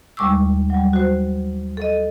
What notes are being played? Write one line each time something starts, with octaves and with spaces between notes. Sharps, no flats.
D#2 G3 G#3 C#6 D6 E6
F#3 G3
F#4 C5
A4 D#5